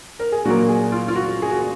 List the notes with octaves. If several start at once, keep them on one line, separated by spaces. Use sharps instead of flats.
A#4
G#4
A#2 F#3 A#3 F#4
G#4
F4
F4
F#4
G#4
F#4